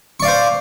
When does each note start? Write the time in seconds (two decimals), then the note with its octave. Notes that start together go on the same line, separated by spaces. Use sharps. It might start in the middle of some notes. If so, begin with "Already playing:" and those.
0.20 C#6
0.22 D5
0.25 F5
0.28 C5